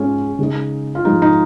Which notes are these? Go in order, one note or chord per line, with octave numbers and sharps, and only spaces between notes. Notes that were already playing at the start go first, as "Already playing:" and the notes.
Already playing: G#2 G#3 C#4 F4
C#3 G#3 D#4
F4
G#2 F3 G#3 D#4
D#4